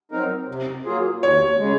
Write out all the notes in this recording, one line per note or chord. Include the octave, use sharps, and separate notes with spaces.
F#3 C4 D#4 A#4
C3
F#3 A#3 F4 G#4
D#2 C#5
C#3 G#3